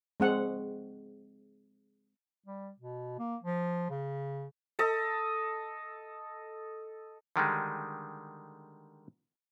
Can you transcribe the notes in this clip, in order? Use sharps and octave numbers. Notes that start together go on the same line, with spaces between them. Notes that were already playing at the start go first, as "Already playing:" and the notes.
G#3 C4 F#5
G3
B2
A#3
F3
C#3
A4 D#5
D3 D#3 G3 G#3